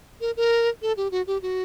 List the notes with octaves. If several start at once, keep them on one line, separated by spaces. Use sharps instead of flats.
A#4
A#4
A4
G4
F#4
G4
F#4